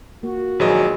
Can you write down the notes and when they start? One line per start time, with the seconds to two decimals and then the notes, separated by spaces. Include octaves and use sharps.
0.23 A#3 F#4
0.60 A#1 D#3 F#3 G#4 B4 D#5